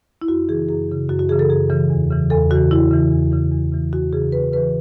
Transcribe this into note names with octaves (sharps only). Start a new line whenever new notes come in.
E4
F#2 F#4
C#3 E3 G#4
F#2 G#4
C#3 E3
F#2 F#4
F#4
C#3 E3 G#4
A4
F#2 G#4
C#3 E3
E2
C#3 E3
E2 A4
C#3 E3 F#4
E2 E4
C#3 E3
E2
C#3 E3
E2
C#3 E3
E2 F#4
C#3 E3 G#4
E2 B4
C#3 E3 B4